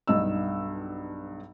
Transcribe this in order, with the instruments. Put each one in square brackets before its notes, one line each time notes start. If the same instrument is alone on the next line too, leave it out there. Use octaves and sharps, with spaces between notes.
[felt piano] B1 G2 D#4 E6